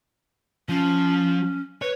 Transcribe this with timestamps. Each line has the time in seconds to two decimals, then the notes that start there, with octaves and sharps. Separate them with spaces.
0.69 F3 C#4
1.82 B4 C#5